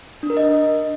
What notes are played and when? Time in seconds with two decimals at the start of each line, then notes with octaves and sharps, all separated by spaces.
0.23 D4
0.30 A#4
0.37 D#5